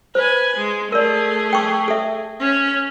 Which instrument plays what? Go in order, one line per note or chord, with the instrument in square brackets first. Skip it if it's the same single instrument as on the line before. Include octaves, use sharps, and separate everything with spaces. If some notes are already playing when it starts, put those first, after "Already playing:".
[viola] B4 G#5 [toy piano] C5
[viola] G#3
[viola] A3 G#4 [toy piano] A#4 D5
[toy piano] G5 C#6
A4 E5
[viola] C#4